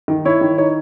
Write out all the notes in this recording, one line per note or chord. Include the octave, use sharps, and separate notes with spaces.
D#3
E4 C#5
D#3
D#4 C#5